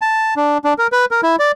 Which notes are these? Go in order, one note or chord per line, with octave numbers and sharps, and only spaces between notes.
A5
D4
D4
A#4
B4
A#4
E4
D5